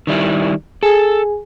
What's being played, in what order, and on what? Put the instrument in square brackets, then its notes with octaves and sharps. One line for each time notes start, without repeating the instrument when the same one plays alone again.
[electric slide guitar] D#3 G3 E4
[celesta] G#4 G#5 [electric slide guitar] A4